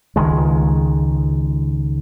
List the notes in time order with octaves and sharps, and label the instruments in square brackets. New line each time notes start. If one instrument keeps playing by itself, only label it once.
[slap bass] C#2 D#3 G#3